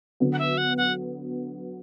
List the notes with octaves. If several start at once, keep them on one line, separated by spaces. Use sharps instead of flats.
D3 F#3 B3
F#5
E5
F#5
F#5